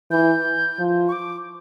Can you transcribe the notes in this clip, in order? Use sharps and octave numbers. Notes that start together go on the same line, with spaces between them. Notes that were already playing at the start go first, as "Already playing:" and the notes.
E3 G6
F3
C#6
D6